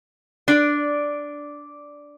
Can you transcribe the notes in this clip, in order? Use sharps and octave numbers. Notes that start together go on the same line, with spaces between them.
D4 D5